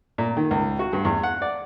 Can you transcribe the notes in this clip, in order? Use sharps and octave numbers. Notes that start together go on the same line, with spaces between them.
A#2
D#3
C#2
F#4
G2
E2
F#5
D5